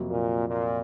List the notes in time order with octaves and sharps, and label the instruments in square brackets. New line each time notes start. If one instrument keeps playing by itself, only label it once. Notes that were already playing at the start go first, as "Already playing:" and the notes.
Already playing: [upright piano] F2 C3 F#3 A#3
[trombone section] A#2
A#2